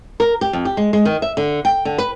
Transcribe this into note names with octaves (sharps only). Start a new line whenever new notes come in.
A#4
G4
F2
G4
G#3
G#3
D#3
E5
D3
G5
D3
B4